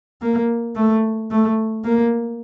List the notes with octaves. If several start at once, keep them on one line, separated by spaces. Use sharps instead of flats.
A#3
A3
A3
A#3